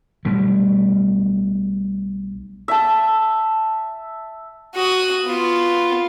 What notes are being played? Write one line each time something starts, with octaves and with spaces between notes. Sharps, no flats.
B1 B2 G3 A3
E5 A5
F#4 D#6
B3 F4